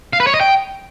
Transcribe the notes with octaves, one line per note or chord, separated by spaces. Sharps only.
F5
B4
C#5
D#5
G5